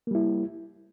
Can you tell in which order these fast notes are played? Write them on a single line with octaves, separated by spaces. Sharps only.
A#3 G3 E4